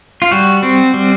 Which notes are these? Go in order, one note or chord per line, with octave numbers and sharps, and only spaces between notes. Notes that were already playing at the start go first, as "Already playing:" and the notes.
F4
G3 F#4
C4
G3